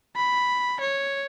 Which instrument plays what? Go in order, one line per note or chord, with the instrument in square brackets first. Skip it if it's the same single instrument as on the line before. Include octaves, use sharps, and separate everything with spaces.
[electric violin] B5
C#5